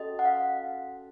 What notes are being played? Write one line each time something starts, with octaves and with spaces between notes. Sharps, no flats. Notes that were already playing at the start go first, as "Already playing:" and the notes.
Already playing: C#4 F#4 A4 D#5
F#5
F5